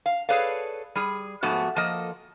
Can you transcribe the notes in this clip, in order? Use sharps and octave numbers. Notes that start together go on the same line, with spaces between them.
F5
G#4 A4 B4 C#5 D5 F5
G3 G#4
G#2 F3 A3 B3 F#4
F3 A#3 A4 D#5